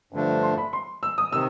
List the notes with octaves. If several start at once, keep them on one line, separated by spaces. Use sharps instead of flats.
G2 D3 F3 A3 D4
C6
B5
C6
E6
D#6
C3 D#3 E6